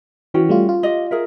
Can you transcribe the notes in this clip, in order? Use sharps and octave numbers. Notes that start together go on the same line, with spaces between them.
E3 C#4 F#4 G5
G3 A3 F4
F4
G4 D#5
G#4 A#4 E5